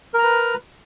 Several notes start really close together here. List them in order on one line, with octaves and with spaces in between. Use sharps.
A#4 A#5 B4